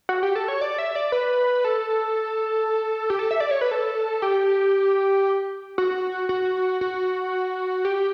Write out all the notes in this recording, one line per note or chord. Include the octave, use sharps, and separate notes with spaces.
F#4
G4
A4
C#5
D5
E5
D5
B4
A4
G4
A4
E5
D5
C#5
B4
A4
G4
F#4
F#4
F#4
G4